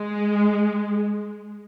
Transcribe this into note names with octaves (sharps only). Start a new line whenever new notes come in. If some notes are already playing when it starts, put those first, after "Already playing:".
Already playing: G#3